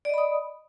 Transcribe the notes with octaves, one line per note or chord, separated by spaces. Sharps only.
D5 D#5 B5 D#6